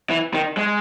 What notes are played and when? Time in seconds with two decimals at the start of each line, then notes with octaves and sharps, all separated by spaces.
0.10 E3
0.34 D#3
0.57 G#3